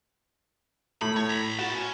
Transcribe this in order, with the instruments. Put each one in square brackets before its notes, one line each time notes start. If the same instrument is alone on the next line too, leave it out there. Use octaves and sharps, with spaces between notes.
[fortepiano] A2 [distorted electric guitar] B5
[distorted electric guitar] C#5
A#5 B5
[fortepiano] F#4 [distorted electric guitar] A#4 A5
[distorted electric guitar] C#4